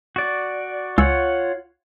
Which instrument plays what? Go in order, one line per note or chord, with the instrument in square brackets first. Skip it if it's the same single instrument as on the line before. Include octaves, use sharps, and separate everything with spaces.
[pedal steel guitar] F#4 D5
[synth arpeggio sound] C#2 G#5 E6 [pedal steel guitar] F4 C#5 F#5